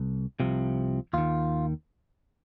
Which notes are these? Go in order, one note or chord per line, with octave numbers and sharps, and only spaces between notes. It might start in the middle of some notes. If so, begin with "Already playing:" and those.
Already playing: C2
C2 C3 F3
D#2 D#3 F4